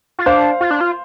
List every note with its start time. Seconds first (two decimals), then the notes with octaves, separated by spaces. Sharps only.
0.19 F4
0.26 D4 C5 F5
0.61 F4
0.71 D4
0.81 F4